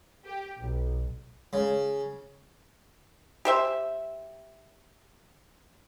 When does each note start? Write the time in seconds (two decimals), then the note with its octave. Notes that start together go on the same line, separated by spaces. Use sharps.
0.25 G4
0.58 B1
1.53 C#3
3.45 G4 C5 E5